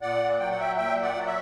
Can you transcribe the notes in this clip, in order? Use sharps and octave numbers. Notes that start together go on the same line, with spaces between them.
A#2 D5 F#5
F#3 G5
F#5
E5 G5
A#2 E5 G5
D5 F#5
F#3
E5